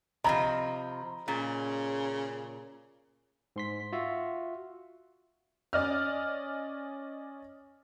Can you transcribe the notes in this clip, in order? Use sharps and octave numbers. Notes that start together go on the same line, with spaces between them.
C3 E3 F3 D#5 A#5 B5
A#2 C#3
G#2 C6 B6
F4 F#4 E5
C#4 D5 D#5 F6